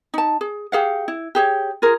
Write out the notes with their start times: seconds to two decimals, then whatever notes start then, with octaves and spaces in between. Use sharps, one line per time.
0.14 D#4 A5
0.41 G#4
0.72 G4 G#4 F5 F#5
1.08 E4
1.35 G4 G#4 C#5
1.82 F4 G#4 A#4